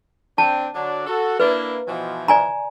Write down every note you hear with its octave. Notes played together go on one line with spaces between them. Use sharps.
C4 D4 G5 A5
D3 F#3 D4
F#4 A4
A#3 D4 E4 B4
B2 E3 F3
D5 G#5 A#5